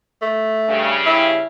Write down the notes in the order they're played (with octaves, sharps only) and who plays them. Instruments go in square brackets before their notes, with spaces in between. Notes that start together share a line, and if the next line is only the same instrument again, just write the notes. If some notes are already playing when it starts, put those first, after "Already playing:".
[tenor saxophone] A3
[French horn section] G2 C#3
[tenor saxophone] E4